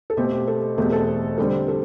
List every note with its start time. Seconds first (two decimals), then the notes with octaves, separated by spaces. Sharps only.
0.10 A4
0.17 B2 A3 C4 G4
0.31 G4
0.47 A4
0.78 E2 B2 A3 C4 G4
0.92 A4
1.07 C5
1.38 D3 G3 C4 A4
1.68 A4